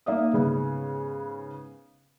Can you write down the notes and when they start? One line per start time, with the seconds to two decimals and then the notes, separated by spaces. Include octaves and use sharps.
0.06 A#3 D#4 D5 E5 F5 D#6
0.33 G#2 C#3 B3